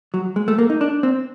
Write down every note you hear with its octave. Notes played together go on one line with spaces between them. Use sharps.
F#3
G#3
A3
A#3
D#4
D4
C4